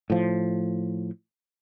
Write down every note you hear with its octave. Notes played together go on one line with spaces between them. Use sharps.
A2 F3